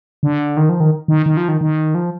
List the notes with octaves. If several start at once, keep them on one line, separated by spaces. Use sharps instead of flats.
D3
D#3
F3
D#3
D#3
D#3
F3
D#3
D#3
F3